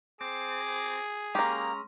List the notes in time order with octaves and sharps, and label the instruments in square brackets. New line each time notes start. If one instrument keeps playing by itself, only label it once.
[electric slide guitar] C4 [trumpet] G#4 [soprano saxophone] D6
[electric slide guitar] G#3 C#4 [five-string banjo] A#3 G4 [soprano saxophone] A#5